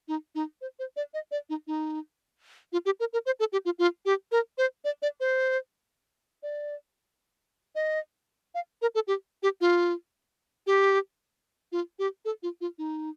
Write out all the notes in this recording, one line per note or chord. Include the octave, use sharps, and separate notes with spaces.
D#4
D#4
C5
C5
D5
D#5
D5
D#4
D#4
F4
G4
A#4
A#4
C5
A4
G4
F4
F4
G4
A#4
C5
D5
D5
C5
D5
D#5
F5
A#4
A4
G4
G4
F4
G4
F4
G4
A4
F4
F4
D#4